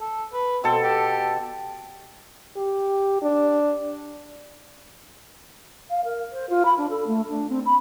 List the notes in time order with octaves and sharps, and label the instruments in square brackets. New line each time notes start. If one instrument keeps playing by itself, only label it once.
[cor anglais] A4
B4
[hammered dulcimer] B2 A4 [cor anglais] C4
[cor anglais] G4
[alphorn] G4
D4
[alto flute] F5
A#4
C5
F4
B5
D4
A4
A3
D4
C4
B5